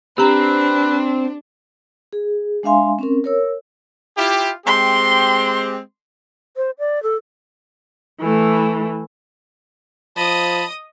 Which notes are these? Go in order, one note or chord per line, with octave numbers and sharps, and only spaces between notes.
C4 D4 G4 B4 A#5
G#4
G#3 D4 E5 F5 G#5 C6
C4 C#4 A#4
A#4 C#5 E6
E4 F4 G4
G#3 C4 G4 C6
C5
D5
A4
E3 A3
F3 D#5 A5 B5 D#6